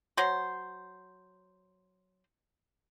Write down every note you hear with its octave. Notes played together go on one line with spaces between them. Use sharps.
F#3 C5